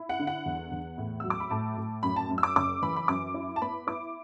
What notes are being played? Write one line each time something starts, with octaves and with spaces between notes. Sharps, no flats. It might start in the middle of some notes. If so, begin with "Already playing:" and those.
Already playing: E4
F#5
D3
F#5
E2
E2
A2
F#3 E6
D6
B5
A2 A5
A2
F#2 B5
A5
F#2
E6
D6
F#1 D6
E3 B5
B5
F#2 D6
E4
A5
B3 B5
E4 D6